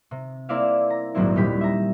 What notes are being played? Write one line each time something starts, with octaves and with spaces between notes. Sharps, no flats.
C3
A#3 C4 E4 D5 E5 F5
A#5
D#1 A#1 G#2 F#3 C4 E4
D#2 A#2 G3 G4 B5
E5 A#5